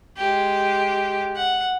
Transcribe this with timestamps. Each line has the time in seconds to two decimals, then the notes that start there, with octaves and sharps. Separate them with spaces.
0.17 G#3 G4
1.36 F#5